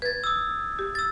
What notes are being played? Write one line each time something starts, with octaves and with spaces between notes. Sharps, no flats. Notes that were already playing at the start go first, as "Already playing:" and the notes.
B4 G#6 A6
D#6 E6
G4
E6 A6